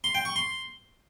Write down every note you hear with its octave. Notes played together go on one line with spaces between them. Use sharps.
C6
G5
C#6
C6